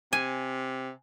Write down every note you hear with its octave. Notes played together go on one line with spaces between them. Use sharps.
C3 G#5